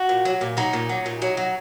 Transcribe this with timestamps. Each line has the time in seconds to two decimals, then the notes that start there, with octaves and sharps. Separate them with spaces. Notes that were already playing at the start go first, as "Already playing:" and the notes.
Already playing: F#4
0.09 A#2
0.25 F#3
0.41 A#2
0.57 F#3 D#4
0.73 A#2
0.89 F#3
1.06 A#2
1.22 F#3
1.37 F#3